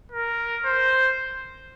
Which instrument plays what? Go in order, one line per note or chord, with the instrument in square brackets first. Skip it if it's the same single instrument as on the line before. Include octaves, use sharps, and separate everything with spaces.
[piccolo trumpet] A#4
C5